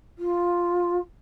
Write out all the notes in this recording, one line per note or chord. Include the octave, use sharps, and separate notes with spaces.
F4